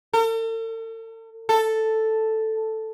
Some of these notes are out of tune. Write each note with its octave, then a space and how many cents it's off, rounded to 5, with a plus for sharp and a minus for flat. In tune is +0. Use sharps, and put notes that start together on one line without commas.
A4 +45
A4 +0